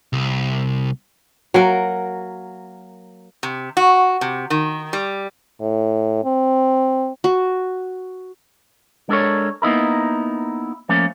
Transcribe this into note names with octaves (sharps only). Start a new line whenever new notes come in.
C2
F#3 A#3 A#4
C3
F#4
C3
D#3
G3
A2
C4
F#4
G#3 D4 A4 A#4 C#5
A#3 B3 D#4 E4 A#4
F3 A3 A#3 C#4